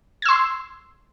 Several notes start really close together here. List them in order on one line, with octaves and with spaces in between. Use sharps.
G#6 E6 C6